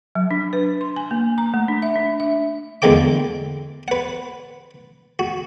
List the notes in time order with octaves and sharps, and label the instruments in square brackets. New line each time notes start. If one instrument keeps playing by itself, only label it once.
[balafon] F#3
D4
B4
C6
G#5
A#3
A#5
A3
D4
E5
D4
E5
[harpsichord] E2 D3 G#3 A#3 G5 D6
B4 F#5
F#4